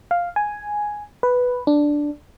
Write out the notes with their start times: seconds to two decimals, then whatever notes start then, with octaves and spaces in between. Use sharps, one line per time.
0.11 F5
0.36 G#5
1.23 B4
1.67 D4